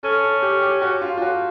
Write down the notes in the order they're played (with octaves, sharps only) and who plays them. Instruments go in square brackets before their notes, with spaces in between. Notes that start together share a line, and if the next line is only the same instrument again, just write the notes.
[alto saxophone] C#4 [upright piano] A4
[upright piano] A4
G4
G4
F#4
F4
F4
F#4